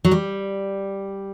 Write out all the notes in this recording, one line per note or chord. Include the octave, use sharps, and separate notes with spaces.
F#3
G3